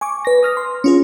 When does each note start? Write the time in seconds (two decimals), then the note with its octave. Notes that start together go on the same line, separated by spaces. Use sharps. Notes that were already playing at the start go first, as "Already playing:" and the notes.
0.01 G#5 C#6 D6
0.25 B4 A#6
0.43 D#6 F6 A#6
0.57 C6
0.84 C#4 F4 G#4